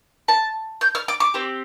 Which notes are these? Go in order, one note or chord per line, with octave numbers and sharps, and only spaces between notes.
A5
G6
F6
D6
D6
C4 G4